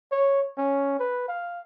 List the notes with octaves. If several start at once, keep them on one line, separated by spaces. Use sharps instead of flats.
C#5
C#4
B4
F5